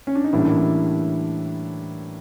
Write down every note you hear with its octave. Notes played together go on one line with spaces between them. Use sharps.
C#4
D4
D#4
A2 E3 G3 A#3 C#4 D4 E4